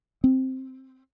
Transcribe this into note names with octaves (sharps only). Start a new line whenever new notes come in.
C4